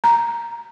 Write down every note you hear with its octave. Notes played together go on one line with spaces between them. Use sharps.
A#5